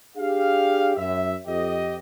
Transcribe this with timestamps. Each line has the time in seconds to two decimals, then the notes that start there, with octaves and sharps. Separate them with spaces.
0.17 D4 G4 G#4 F5
0.96 F#2 E5
1.46 F2 G4 D#5